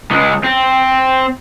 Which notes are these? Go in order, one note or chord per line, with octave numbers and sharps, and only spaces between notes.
C#2 G#3
C4